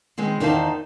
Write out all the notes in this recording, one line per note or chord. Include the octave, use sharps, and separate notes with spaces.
D#3 G#3 B3 C4
E2 D#3 D#4 C5 F5 A5